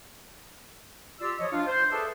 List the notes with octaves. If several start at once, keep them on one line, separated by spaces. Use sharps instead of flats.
F4 G4 D5 C6 E6
F3 C#5 D#5
D4 F4
C5
G#4 A4 B4 D5 E5 A5